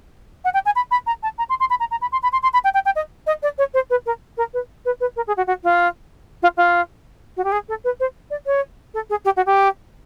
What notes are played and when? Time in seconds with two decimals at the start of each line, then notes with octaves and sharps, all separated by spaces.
0.44 F#5
0.54 G5
0.65 G#5
0.76 B5
0.91 B5
1.06 A#5
1.23 A5
1.38 A#5
1.49 C6
1.60 C6
1.70 B5
1.80 A#5
1.91 A#5
2.01 B5
2.12 C6
2.23 B5
2.32 C6
2.43 C6
2.53 B5
2.64 G5
2.74 G5
2.85 G5
2.96 D#5
3.27 D#5
3.43 D5
3.58 C#5
3.74 C5
3.90 B4
4.06 A#4
4.37 A#4
4.54 B4
4.85 B4
5.00 B4
5.16 A#4
5.27 G#4
5.37 F#4
5.47 F#4
5.64 F4
6.42 F4
6.57 F4
7.37 F#4
7.44 G4
7.52 G#4
7.68 A4
7.84 B4
8.00 C5
8.30 D5
8.46 C#5
8.94 A4
9.10 G#4
9.25 G4
9.36 F#4
9.46 G4